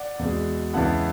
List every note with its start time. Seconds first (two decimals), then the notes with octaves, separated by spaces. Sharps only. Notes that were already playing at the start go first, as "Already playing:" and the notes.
Already playing: D5 F#5
0.19 E2 B2 G#3
0.73 E2 C#3 G#3 B3 E4 F#5 A5